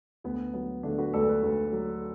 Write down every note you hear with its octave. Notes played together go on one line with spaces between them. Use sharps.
D2 B3
F#3 B3
D3 A3 D4
F#4 B4
D2 A4 D5
F#4 B4
D2
F#3